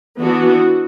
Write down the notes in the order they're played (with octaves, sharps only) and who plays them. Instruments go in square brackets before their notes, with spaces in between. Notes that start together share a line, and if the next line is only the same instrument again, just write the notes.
[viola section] E3 B3 D4 F#4